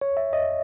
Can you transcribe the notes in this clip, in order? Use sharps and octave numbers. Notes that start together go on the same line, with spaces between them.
C#5
E5
D#5